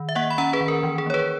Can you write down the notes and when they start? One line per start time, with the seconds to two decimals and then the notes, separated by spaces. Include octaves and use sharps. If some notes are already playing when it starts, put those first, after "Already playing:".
Already playing: D#3
0.09 E5
0.15 A#3 D#5 F#5
0.30 B5
0.38 C#4 F#5 A#5
0.53 G#4 B4
0.61 D#3
0.68 A#4
0.83 E3
0.98 G#4
1.06 A#3 C#5
1.14 G#4 B4